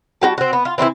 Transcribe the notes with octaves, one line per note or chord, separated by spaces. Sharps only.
G3 F#4 G4 A5
C4 F#4
B3
F4
E3 C4 D4 E4